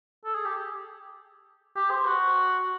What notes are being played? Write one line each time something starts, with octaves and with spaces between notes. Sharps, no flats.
A4
G#4
G4
G4
C5
F#4